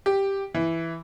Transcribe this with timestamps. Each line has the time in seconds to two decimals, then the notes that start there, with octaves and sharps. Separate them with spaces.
0.06 G4
0.55 E3